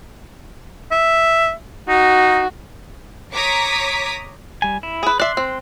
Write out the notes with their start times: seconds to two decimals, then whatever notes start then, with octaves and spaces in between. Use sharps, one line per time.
0.92 E5
1.88 D#4 F#4
3.34 C#5 A#5 D6 D#6 B6 C#7
4.62 G3 G#5
4.83 E4
5.03 G#4 B4
5.20 D5 E5 C6 F#6
5.37 C4